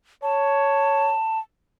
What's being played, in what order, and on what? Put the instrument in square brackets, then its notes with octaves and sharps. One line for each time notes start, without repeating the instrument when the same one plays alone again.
[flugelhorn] C#5 [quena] A5